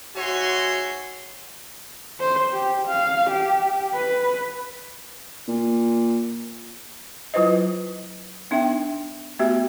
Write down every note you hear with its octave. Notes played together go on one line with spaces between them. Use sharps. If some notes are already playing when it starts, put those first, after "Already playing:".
G#2 F#4 C#5 E5 G#5 C6
C5
G4
F5
G4
B4
A#2
F#3 E4 F4 B4 C5 D#5
B3 D4 D#4 E5 G5
A3 B3 F#4 G4 E5